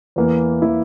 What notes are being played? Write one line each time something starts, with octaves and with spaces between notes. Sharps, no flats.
E2 E3 A#3 E4
E3 A#3 E4